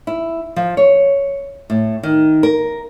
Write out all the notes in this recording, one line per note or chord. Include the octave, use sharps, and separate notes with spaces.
E4
F3
C#5
A2
D#3
A#4